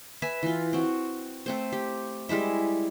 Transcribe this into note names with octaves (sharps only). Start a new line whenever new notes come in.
B4 E5 G#5
E3 F4
C4 F#4
A3 C4 C5
G4
G3 G#3 E4 E5